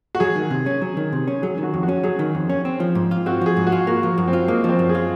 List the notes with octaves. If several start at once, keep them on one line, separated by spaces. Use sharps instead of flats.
F#4
F#3 G#4
D#3
C3
C#4
F#3
D#3
C3
C#4
F#3 G#4
D#3
F#4
F2
F#4
C#4
F#3 G#4
D#3
F2
C#4
C4
F3
G#2
F4
C4 F#4
F3 G#4
G#2
F#4
F4
A#3 F#4
F3
F#2
C4
F4
G#3 A#3
F3 C4
F#2
G#4
F4